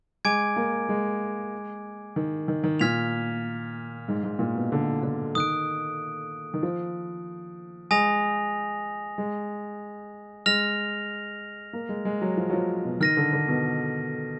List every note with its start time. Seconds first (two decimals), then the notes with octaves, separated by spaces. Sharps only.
0.25 G#3 G#5 D6 G#6 D7
0.56 A#3
0.89 G#3
2.16 D#3
2.48 D#3
2.64 D#3
2.80 A#2 F6 G#6 B6 F7
4.08 G#2
4.24 G#2
4.39 A#2
4.55 B2
4.72 D3
5.03 D3
5.35 D#3 D#6 F#6 D7
6.54 D#3
6.63 F3
7.91 G#3 G#5 D#6 A#6 F7
9.18 G#3
10.46 G#3 F6 A#6 F7
11.73 A#3
11.89 G#3
12.05 G#3
12.21 F#3
12.37 F3
12.49 F#3
12.53 F3
12.85 B2
13.00 D#3 F6 A#6 D#7
13.17 D3
13.33 D3
13.48 B2